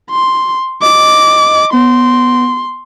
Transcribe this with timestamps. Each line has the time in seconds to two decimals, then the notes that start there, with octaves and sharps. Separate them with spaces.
0.10 C6
0.82 D#5 D6
1.73 B3 C6